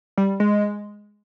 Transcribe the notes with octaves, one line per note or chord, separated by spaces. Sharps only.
G3
G#3